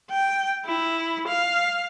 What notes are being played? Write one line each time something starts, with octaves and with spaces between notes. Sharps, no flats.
G5
E4
F5